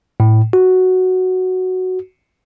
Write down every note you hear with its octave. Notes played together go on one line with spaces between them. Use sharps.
A2
F#4